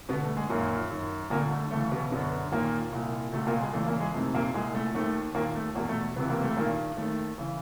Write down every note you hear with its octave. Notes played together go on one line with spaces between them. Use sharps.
D2 B2 D3 B3
A3
G#3
F#2 A#2 D#3 A#3
F#2 D#3
D2 A#2 D3 A#3
A3
D2 C#3 E3 A3
B2 B3
F#2 B2 D3 B3
D#2 A#2 D#3 A#3
C2 A#2
C#2 B2 A3
A#2 A#3
G#3
E2 C#3 E3 A3
A#2 A#3
G#3
F2 C3 D#3 A3
A#2 A#3
C2 A#2 G#3
A3
D#2 D#3 A3
D#2 A#2 D#3 A#3
A3
E2 A#2 B2 A#3
A3
C#2 C3 E3 B3
A#3
A3
G2 A#2 D#3 A#3
D#2 D#3 A3
C#3 E3